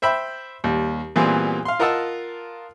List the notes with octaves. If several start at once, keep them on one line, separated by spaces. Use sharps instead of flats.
C5 E5 G5 B5
D#2 G3
A#2 E3 G3 B3 C4 G#4
F5 C6
F4 A#4 D#5 F#5 A5 E6